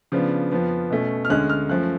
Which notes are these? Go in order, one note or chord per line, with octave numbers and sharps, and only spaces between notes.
C#3 F3 B3 D4
F2 F3 B3
B2 A3 C#4
F6
D2 D3 G#3 C#4 F#6
F6
F#2 F3 A3 C#4 F#6